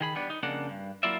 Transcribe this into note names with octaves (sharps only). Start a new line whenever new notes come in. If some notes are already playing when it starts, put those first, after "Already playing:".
D#3 G#4 B5
G3 B3 D4
D#4
F2 C#3 A#3 D4 F#5
G2
F#3 A#3 E4 F4 D5 E5